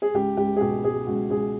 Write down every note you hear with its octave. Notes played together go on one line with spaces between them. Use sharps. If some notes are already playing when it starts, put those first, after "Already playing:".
G#4
C#2 G4
C#2 G4
G#4
B2 G4
B2 G#4
C#2 F#4
C#2 G#4